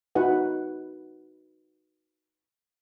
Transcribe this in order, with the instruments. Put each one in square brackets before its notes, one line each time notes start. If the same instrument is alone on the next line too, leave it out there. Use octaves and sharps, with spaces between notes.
[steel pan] D#4 F#4 B4 F#5